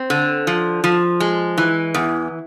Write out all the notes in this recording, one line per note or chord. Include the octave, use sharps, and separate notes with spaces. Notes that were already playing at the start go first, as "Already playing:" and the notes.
Already playing: C4
D3
F3
F3
G#3
E3
E2